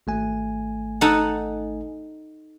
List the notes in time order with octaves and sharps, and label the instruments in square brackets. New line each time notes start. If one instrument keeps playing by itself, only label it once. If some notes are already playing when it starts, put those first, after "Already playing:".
[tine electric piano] G#1 A3 G#5
[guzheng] D#4 A4 F#5